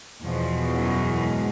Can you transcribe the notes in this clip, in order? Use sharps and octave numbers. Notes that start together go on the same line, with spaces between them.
E2 B2 F3
F#2 F#3
G#2 G#3